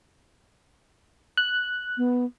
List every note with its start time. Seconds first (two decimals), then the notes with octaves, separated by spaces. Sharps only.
1.37 F#6
1.97 B3